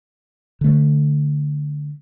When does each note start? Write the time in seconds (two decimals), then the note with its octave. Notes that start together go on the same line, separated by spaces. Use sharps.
0.61 D3 A3